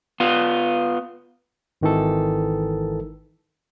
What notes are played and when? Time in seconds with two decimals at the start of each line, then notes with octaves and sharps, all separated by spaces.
0.20 B3 F4
1.81 G#1 D#3 E3 A4